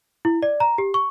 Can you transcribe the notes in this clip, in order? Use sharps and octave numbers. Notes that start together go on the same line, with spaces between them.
E4
D5
A#5
G4
C#6